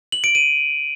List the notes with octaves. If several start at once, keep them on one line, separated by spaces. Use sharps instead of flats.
F#7
D7
D#7